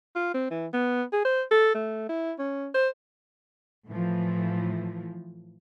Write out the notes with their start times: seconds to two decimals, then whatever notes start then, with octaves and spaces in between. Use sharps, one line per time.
0.16 F4
0.34 C4
0.51 E3
0.73 B3
1.13 G#4
1.25 C5
1.52 A4
1.75 A3
2.09 E4
2.39 C#4
2.75 C5
3.89 A2 E3 F3